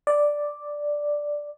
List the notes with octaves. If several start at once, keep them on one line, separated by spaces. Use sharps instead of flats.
D5